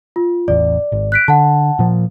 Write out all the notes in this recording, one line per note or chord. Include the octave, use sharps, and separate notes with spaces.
F4
A1 E2 D5
G#1
F#6 B6 D7
D3 F#5 A5
A#2 F3